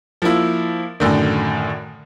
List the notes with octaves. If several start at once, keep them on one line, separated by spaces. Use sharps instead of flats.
F3 A#3 E4
F#2 A2 D3 D#3